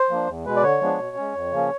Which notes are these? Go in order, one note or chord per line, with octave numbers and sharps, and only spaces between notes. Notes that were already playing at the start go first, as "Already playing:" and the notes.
Already playing: C5
F3 A#3 D4
E2
B2 G#3 B4
D5
D3 C#5
F3 G#3 B3 D4
B2
G#3 C#4
F2
C#3 F3 A#3 C#4